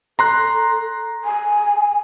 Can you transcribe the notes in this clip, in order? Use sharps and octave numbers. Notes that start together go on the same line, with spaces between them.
A4 A#5 C6 F#6
G#5